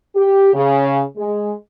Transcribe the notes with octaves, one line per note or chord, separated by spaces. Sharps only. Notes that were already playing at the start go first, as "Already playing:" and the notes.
G4
C#3
G#3